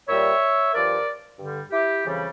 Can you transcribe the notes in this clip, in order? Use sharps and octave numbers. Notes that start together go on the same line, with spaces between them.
A#2 G3 C#5 E5
G2 F3 A#4 D5
G2 D3 G3
E4 G4
F2 C#3 E3 G3